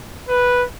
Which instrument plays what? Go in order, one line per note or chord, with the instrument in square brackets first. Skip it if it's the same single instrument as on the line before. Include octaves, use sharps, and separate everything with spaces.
[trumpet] B4